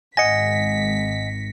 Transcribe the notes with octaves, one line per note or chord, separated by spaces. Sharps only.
G#1 D#5 F#5 G#5 A#6 B6 C#7